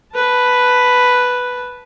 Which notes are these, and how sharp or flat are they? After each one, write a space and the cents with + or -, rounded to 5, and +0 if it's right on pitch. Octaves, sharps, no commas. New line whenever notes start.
B4 +0 A5 +0